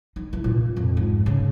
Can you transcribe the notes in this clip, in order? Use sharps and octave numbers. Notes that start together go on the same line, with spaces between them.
D#4
E3
A#2
F2
G#2
C#3